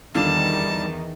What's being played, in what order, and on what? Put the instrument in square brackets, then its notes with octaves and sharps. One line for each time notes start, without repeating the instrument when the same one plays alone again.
[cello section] E2 D#3 [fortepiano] D3 F4 [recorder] G3 [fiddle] A5